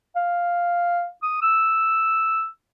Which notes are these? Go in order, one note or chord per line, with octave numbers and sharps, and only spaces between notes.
F5
D#6
E6